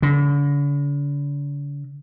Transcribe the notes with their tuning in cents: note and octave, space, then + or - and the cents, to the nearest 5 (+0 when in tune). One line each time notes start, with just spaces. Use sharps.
D3 -45